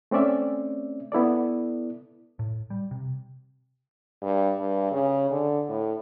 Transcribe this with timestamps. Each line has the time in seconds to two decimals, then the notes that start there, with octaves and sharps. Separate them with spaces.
0.11 A3 C4 C#4 D5 E5
1.12 B3 E4 A4 D5
2.39 A2
2.70 G3
2.91 C3
4.22 G2
4.60 G2
4.92 C#3
5.31 D3
5.69 A2